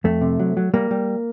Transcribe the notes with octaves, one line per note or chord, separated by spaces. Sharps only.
F2 A3
C3
F#3
F#3
G3 A#3
G3